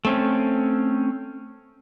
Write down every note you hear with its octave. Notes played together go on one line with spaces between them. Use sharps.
A3 C4 C#4